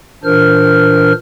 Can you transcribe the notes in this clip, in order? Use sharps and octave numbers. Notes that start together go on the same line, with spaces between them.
A#2 E3 D4 A#4 C5 F6